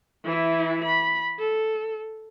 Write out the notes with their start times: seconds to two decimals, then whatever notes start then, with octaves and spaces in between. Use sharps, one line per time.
0.25 E3 E4
0.85 B5
1.39 A4